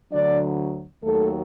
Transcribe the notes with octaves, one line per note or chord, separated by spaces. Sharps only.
D2 D3 F#3 D4 D5
D#2 D#3 F#3 A3 A4